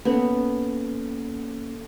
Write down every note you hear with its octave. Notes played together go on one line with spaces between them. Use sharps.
A#3 B3 C#4 A4